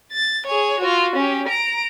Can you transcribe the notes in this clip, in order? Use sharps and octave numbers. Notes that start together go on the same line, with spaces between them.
A6
G#4 C#5
F4 F#4
C#4 G4
A#5 D7